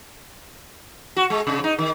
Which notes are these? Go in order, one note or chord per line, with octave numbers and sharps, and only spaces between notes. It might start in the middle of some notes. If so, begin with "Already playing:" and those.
F#4
G#3
C3
D#4
D#3